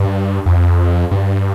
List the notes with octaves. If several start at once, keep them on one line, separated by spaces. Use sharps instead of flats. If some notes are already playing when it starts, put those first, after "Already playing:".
Already playing: G2
F2
G2